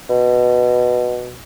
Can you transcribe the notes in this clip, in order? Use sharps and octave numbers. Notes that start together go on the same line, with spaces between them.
B2